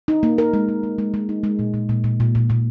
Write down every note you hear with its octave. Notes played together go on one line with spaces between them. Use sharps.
D#4
A#3
A#4
G#3
G#3
G#3
G#3
G#3
D#4
G#3
A#2
A#2
A#2
A#2
A#2
A#2
A#2